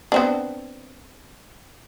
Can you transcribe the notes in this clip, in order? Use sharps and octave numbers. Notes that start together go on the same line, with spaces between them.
B3 C4 D4